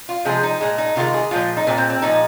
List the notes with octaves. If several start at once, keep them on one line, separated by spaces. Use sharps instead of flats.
F4
C3 F3 G#3 G#4
D#4
A#2 G#3
D#4
C3 D#3 G#3 F4
G#4
A#2 F3 G#3 F4
D#4
A#2 G#3 C4
C4
C4
A#2 F3 G#3 D#4